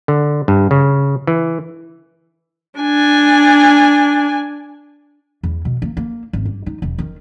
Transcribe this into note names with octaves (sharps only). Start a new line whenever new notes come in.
D3
G2
C#3
E3
D4 G#5
E2
B2
A#3
A#3
G#1
G2
D#4
E1
D#3